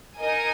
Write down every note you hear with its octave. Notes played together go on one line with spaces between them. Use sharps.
D#4 A#4 D#5 G#5